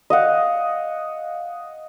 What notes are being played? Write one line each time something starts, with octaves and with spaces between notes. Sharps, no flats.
D#5 F5 F#5